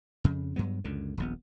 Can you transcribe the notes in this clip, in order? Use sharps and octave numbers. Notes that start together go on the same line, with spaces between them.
F2 C#3
G2 F#3 B3
C#2 F#2 D3
D#1 A#1 B3